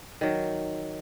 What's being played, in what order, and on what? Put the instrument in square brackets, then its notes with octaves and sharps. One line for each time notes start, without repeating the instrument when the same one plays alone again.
[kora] D#3 F#3